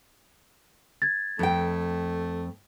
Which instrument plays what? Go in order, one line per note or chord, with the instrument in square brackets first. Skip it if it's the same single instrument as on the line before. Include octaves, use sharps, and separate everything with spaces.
[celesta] G#6 A6
[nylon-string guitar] F2 G5 [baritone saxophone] A3